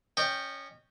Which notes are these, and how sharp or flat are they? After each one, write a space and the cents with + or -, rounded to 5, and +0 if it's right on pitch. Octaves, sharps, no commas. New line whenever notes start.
C#4 +0 D#5 -30 G5 +0